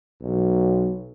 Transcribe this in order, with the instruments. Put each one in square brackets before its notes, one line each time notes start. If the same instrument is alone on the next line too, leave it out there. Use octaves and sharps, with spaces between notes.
[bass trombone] B1